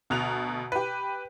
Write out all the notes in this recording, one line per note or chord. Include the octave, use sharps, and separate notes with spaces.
D2 B2 A#5 F#6 F7
G4 B4